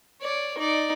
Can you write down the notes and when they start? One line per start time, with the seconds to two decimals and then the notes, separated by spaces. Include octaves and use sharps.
0.22 C#5 D5
0.58 D#4 D5